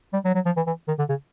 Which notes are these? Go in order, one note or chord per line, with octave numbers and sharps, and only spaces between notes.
G3
F#3
F#3
F3
E3
E3
D#3
D3
C#3